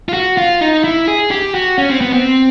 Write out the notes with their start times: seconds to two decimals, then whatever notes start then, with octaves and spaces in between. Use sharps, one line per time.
0.09 F4
0.13 F#4
0.37 F4
0.61 D#4
0.84 E4
1.07 G#4
1.31 G4
1.55 F#4
1.78 C#4
1.89 C4
2.01 B3
2.13 C4